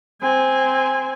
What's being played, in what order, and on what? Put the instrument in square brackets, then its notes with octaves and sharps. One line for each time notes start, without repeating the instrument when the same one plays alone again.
[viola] C4 G#5